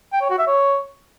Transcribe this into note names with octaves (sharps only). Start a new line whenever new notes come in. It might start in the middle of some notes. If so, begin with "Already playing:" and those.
G5
C#5
F#4
E5
C#5